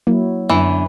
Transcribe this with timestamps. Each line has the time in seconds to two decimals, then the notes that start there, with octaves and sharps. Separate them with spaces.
0.07 F#3 A#3 E4
0.49 F#2 D3 E3 B3